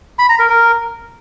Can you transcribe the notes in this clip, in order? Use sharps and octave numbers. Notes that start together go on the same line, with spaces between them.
B5
A#5
A#4
A#4